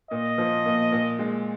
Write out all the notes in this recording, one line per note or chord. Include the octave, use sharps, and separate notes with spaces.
A#2 D#5
F3
A#2
A#2
G#3